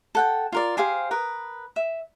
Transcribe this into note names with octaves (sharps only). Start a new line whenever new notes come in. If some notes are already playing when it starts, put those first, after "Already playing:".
A4 F#5 G5
F4 A#4 D5
G4 G#4 C5 F5
A#4 B4 D#6
E5